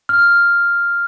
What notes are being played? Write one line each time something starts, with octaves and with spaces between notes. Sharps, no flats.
F6